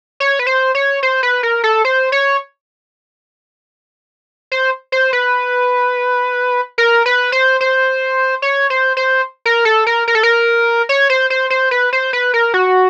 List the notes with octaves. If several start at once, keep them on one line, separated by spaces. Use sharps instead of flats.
C#5
B4
C5
C#5
C5
B4
A#4
A4
C5
C#5
C5
C5
B4
A#4
B4
C5
C5
C#5
C5
C5
A#4
A4
A#4
A#4
A4
A#4
C#5
C5
C5
C5
B4
C5
B4
A#4
F#4